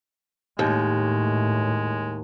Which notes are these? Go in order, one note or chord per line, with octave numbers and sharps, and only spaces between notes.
D#2 A2 G#3